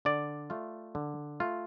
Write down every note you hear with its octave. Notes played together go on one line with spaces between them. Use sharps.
D3 D5
A3 F4
D3
A3 F4